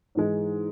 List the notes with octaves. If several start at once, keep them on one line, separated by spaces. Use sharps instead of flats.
G#2 E3 G#3